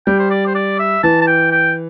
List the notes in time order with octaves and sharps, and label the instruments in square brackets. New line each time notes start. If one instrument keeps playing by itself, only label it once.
[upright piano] G3 [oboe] G5
[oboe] C5
D5
C5
D5
E5
[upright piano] E3 [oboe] A5
[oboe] A5
G5
G5